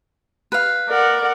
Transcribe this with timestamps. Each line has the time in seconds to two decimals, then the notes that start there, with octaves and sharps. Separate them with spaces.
0.52 B4 F5
0.87 A#4 D5 F#5